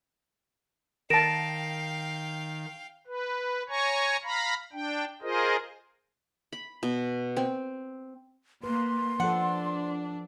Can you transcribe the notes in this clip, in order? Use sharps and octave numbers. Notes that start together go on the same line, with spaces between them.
D#3 A#4 F5 G5 A5 A#6 D7 E7
B4
C#5 G#5 A#5 C#6
F5 A#5 B5
D4 G5
F4 G#4 A#4 C5 D#5
B5
B2
C4
A#3 B4 C6
F3 D4 A4 F#5